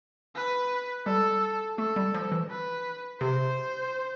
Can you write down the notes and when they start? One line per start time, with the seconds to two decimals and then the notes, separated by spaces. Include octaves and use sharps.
0.36 B4
1.06 G3 A4
1.78 A3 A4
1.96 G3
2.14 F3
2.32 E3
2.50 B4
3.21 C3 C5